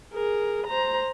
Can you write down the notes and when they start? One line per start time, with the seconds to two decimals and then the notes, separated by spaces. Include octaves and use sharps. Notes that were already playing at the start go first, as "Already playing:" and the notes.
0.13 G#4 A#4
0.67 C5 A#5